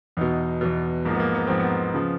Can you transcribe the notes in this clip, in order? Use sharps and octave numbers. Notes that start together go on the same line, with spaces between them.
E2 B2 D#4
E2 B2
G#2 F3 A#3
B3
A#3
B3
G#2 F3 C4
B3
C#3 F3